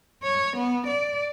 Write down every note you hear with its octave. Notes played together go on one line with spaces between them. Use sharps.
C#5
B3
D5